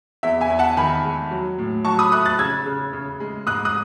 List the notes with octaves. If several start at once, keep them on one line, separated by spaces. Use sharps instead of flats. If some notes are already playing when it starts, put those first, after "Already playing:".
E2 E5
E5 G#5
E2
F#5 A5
D#3 G#5 B5
G#3
F#3
A2
F#3 A5 C#6
B5 D#6
A3 D#6 F#6
F#6 A6
C#3 E6 G#6
C#3
C#3
G#3
G#2 D#6 F#6
D#6 F#6